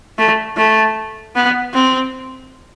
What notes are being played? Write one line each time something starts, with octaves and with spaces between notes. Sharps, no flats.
A3
A3
B3
C4